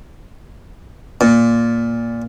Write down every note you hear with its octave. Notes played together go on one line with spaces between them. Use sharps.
A#2